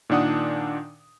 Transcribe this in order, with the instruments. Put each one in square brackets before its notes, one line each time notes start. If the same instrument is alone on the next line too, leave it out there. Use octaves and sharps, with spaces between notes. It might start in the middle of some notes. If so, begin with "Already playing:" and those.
[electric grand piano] A#2 D#3 D4 F#5 D#6